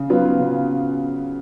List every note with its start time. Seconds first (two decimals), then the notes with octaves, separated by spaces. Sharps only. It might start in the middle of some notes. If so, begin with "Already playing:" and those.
Already playing: C#3
0.10 F#3 B3 F4 B4
0.39 C#3